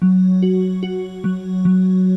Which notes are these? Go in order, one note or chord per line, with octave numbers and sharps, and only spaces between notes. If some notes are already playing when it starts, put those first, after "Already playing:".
F#3
F#4
F#4
F#3
F#3